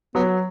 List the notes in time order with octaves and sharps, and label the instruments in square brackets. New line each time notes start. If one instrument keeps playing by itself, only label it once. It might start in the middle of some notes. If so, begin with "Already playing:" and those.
[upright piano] F#3 [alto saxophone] B3